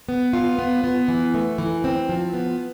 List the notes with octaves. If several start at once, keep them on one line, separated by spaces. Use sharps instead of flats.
B3
F4
B3
B3
E3
A3
E3
C4
F3
B3